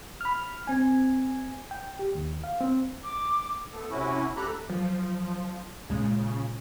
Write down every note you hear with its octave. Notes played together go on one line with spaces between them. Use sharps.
B5 F6
C4 G#5
G5
G4
D#2
F5
C4
D6
A3 B3 A4
C3 C#4 E4 F#4
D2 G4 A4 A#5 B5 F#6
F3 F#3
C#2 A#2 C#3 G#3